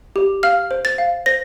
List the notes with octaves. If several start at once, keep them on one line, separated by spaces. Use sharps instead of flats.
G4
F5 F6
C5
A6
F5
C5 A#6